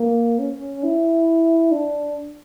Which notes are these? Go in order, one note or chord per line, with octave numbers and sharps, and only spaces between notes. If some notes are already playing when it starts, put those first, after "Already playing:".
Already playing: A#3
C#4
E4
D4